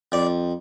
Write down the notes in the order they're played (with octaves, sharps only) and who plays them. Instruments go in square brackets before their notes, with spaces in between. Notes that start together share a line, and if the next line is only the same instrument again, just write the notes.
[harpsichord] F2 D5